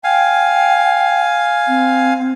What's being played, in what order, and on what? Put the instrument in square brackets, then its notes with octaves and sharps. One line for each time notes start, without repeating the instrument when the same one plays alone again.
[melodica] F5 G#5 [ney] G5
[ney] C4